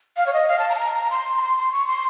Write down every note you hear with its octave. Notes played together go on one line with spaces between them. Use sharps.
F5
C#5
D#5
F5
A5
A#5
A5
A#5
A#5
C6
A#5
C6
C6
C#6
C6